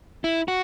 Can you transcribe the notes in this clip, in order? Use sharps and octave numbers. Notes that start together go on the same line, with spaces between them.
E4
F#4